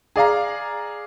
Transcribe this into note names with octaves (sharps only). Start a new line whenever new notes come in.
G#4 D5 F5 A#5